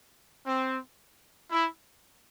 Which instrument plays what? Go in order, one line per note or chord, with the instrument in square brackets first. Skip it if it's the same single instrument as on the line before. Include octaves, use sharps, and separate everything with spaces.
[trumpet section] C4
E4